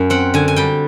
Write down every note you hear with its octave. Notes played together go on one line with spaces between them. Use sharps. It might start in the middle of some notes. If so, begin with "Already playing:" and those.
Already playing: F#2
C4 F#5
D3 G#5
G#5
G3 G5